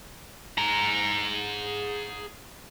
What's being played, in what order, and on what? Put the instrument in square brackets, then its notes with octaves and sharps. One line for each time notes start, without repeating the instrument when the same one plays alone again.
[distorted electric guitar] G#4 A#5